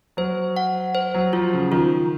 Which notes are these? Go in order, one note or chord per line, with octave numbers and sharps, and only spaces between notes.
F#3 C5
F#5
C5
F#3
F3 F4
C#3
D#3 F4